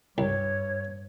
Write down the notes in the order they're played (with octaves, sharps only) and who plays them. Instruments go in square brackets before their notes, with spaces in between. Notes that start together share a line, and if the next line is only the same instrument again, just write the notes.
[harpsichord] C2 [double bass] G2 [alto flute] C#5